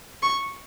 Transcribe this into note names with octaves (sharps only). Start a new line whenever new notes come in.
C#6